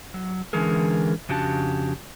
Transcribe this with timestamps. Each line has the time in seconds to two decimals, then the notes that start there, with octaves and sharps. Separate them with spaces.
0.14 F#3
0.53 D3 E3 G#3 C#4 G#4 A#4
1.29 F2 C#3 D4 F#4 G4 A5